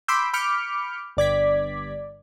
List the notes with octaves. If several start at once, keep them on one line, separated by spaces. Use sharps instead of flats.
B5 C6 D6 E6 G6
B5 D6 F6 G6 C#7
G1 D5 G#6 B6